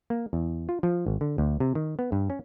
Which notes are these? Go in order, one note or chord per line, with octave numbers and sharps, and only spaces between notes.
A#3
E2
F4
F3
G#1
D3
D2
C3
D#3
B3
G2
C#4